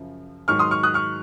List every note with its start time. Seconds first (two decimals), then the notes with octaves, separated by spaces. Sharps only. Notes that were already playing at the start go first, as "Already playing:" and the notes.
Already playing: F#2 C#3 F3
0.48 G#2 D#3 F#3 C#6 F6
0.59 C6 D#6
0.71 C#6 F6
0.83 D#6 F#6
0.94 C#6 F6